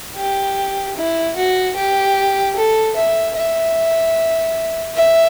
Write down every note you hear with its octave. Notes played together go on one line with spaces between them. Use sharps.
G4
E4
F#4
G4
A4
E5
E5
E5